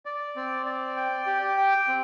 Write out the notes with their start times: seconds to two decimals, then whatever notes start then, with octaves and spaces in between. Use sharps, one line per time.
0.05 D5
0.36 C4
0.66 D5
0.97 G5
1.26 G4
1.58 G5
1.88 C4